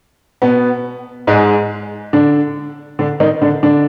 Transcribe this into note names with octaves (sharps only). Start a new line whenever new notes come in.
B2 B3
G#2 G#3
D3 D4
D3 D4
D#3 D#4
D3 D4
D3 D4